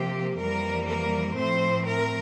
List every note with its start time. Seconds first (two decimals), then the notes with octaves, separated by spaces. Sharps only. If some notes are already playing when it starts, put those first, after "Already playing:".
Already playing: C3 F3 A#3 G4
0.38 F2 E3 G3 A#3 A#4
0.87 A#4
1.36 A2 F3 A3 C4 C5
1.86 A#4